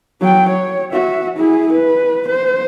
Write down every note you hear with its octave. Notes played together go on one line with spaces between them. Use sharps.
F#3 G5
C#5
F#4 E5
E4 G#4
B4
C5